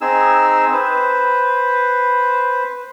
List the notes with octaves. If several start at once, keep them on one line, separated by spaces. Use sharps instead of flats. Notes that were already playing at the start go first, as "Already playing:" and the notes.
C4 D#4 G#4 E6
B4 C5